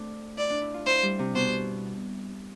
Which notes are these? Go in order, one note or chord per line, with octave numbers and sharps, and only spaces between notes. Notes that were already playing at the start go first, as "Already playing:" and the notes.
Already playing: A3 C4 D4
E4 D5
D4
E4
F4
E4 C5
G3
C3
B2 C5